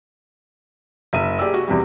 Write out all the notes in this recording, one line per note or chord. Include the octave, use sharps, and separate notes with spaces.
F#1 E5 D#7
G4 G#4 D5 E6
F#4
E2 C3 G3